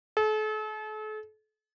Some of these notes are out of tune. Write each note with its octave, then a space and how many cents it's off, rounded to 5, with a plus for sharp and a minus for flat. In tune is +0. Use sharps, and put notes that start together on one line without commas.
A4 -40